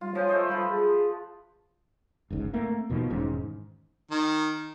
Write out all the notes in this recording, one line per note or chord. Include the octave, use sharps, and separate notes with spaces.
G3 F4
F3 C5 C#5 G#5
A3 C5 D#5
G3 F4 A4 B4
G#4
G1 C#2 G#2
A3 A#3 C4
D#2 B2 D#3 F3
E1 G#2 D#3 C#4
D#3